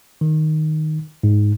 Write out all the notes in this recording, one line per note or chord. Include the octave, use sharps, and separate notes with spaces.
D#3
G#2